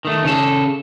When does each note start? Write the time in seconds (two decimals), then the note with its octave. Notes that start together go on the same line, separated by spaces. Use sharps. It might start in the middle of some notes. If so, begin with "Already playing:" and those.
0.05 D#3 A3
0.25 C#3 A4